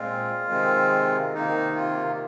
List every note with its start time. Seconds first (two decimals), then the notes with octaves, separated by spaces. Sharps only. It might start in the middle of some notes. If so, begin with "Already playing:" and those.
Already playing: A#2 G#3 C4 F4
0.49 C3 D#3 G#3 C4
1.34 C3 D#3 A#3 D#4
1.76 F4